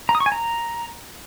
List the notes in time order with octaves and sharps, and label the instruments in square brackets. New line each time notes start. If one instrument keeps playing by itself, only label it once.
[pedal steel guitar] A#5
D#6
C#6
G#5
A#5